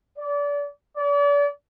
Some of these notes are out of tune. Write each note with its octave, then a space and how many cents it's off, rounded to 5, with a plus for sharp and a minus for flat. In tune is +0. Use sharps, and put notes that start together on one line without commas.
D5 -30
D5 -40